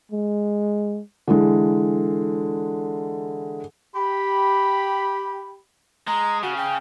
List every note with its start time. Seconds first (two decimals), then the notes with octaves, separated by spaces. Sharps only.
0.12 G#3
1.28 D3 E3 G#3
3.95 G4 B5
6.07 G#3 A#5
6.43 C#3 F#4
6.57 G5